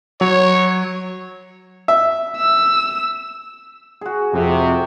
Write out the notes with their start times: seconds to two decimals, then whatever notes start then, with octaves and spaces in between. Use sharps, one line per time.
0.21 F#3 C#5
1.88 E5
2.37 E6
4.01 F#4 G#4
4.33 F2 C3